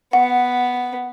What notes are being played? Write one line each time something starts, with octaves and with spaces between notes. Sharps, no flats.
B3 F#5